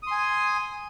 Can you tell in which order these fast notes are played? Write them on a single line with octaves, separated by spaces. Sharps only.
D#6 C6 G#5